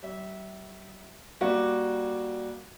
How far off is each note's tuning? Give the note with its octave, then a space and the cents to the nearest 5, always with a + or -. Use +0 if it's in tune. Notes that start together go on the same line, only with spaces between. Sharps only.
G3 -40 E5 -15
G3 +0 A#3 +15 F#4 -5